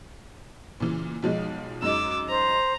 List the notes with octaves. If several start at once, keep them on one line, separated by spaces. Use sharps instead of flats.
A#2 C#3 E3
B1 F3 G#3
F#2 G#3 D#4 D6 E6
C5 A#5